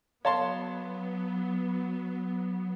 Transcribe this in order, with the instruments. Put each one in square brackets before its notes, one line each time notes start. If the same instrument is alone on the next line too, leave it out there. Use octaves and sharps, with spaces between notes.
[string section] F#3 B3 [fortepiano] C#5 A5 C6 [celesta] F5